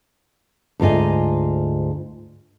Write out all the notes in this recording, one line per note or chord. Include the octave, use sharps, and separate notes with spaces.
D2 G#2 F4 D#5 G#5